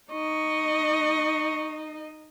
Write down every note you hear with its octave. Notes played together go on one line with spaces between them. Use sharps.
D#4 D#5 C#6